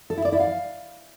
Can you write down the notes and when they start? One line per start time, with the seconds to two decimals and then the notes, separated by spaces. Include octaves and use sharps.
0.10 A4
0.17 E4
0.25 D5
0.32 E4
0.40 F5